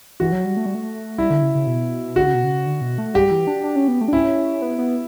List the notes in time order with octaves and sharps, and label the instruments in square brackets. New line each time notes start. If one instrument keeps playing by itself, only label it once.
[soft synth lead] E3 [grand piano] F#4
[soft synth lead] F#3
G3
A3
G3
A3
[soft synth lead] G3 [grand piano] E4
[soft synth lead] D3
C#3
C#3
B2
[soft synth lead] D3 [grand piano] F#4
[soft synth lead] C#3
B2
C#3
D3
B2
A3
[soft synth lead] G3 [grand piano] G4
[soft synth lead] E3
D4
D4
C#4
B3
A3
D4
[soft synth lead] C#4 [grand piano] E4
[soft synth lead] B3
B3